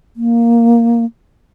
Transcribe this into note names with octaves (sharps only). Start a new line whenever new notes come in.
A#3